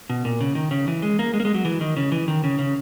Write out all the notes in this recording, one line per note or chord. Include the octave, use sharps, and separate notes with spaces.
B2
A#2
C#3
D#3
C#3
E3
G#3
A#3
G#3
A#3
G#3
F#3
E3
D#3
C#3
E3
D#3
C#3
C#3